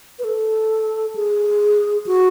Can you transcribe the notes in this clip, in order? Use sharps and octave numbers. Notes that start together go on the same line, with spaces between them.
B4
A4
G#4
F#4